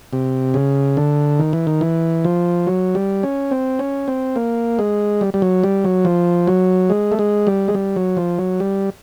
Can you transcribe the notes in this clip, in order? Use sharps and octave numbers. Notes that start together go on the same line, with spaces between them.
C3
C#3
D3
D#3
E3
D#3
E3
F3
F#3
G3
C#4
C4
C#4
C4
A#3
G#3
G3
G3
F#3
G3
F#3
F3
F#3
G#3
A3
G#3
G3
G#3
G3
F#3
F3
F#3
G3